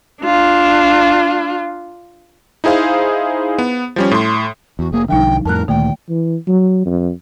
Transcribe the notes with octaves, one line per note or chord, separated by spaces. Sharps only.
D4 F4
D#4 E4 G#4 C5 F5
B3
F3 G3 C#4
A2 C6
E2 F#4
F1 A#3 G#4
B1 D3 F3 G3 D#4 G5
F2 A2 A#4 A5 F#6
D2 A#2 D#3 A3 G5
E3
F#3
F2